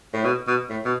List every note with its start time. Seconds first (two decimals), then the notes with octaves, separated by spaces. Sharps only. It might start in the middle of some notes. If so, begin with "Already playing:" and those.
0.13 A2
0.24 B2
0.47 B2
0.69 A2
0.85 B2